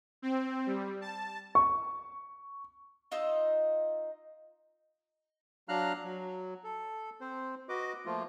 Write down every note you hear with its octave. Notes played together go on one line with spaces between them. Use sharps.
C4
G3
A5
C#6
D#4 F4 D#5 E6
F#3 D4 F5 A#5 F6 F#6
F#3
A4
C4 C5
F#4 B4 D#5 D6
F3 A3 A#3 F4